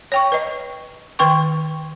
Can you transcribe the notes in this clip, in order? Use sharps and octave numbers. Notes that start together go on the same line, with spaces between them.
C#5 G5 C#6
B4 D#5
D#3 B4 G5 C#6